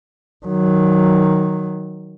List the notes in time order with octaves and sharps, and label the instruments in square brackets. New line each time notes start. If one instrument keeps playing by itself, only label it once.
[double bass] D#3 F#3